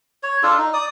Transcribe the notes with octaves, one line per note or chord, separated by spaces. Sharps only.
C#5
D4 F4 A4
D#4
D5 D#6